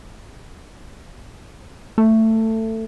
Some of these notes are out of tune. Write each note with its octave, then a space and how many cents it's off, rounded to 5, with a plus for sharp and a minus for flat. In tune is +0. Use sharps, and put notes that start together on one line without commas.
A3 +15